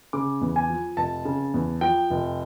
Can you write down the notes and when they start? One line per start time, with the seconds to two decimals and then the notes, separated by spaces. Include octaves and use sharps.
0.13 C#3 D6
0.41 E2
0.56 G#5
0.70 F3
0.97 F1 A5
1.25 C#3
1.54 E2
1.81 F3 G5
2.10 F1